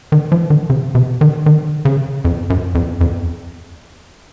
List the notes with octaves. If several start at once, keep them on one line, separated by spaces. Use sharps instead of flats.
D#3
F3
D#3
C#3
C3
D#3
D#3
C#3
F2
F#2
F2
F2